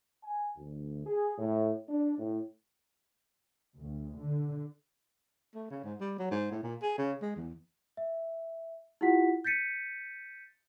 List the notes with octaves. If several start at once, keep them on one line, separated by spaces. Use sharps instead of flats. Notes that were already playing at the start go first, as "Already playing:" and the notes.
G#5
D2
G#4
A2
D4
A2
D2
D3
A3
C#3
G#2
G3
F#3
G#2
A2
A#2
G#4
C#3
G#3
E2
E5
E4 F4 G4 F#5 B6
G6 A6 B6 C#7 D#7